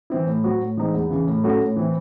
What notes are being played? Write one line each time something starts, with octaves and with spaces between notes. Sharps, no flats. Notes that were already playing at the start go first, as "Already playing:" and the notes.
E3 C4 E4
A2
F#3 C4 F#4
A2
E3 G#3 C4 D#4
E2
C#3 E3
A2
F#3 A3 C#4 F#4
A2
E3 C4 E4